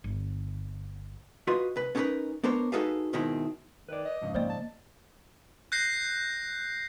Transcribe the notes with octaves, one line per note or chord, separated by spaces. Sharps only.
G1
F4 F#4 B4 D#5 C6
C2 B4
B3 C#4 D#4 G#4 A#4 B4
B3 D4 A#4 C5 C#5
D#4 F#4 G#4 A4 B4 F5
G#2 B2 D#3 G#3 C4 E4
D#3 B4 D5
D#5
F2 G#2 C#3
A#3 C4 C5 D5 D#5
A5
F#6 G6 A#6 C7